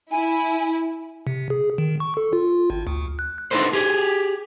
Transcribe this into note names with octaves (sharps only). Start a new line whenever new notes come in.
E4 G#5
C3
G#4
D#3
C#6
A4
F4
F4
G#1
D2
F#6
D4 D#4 G#4 A4 B4 C5
G4 G#4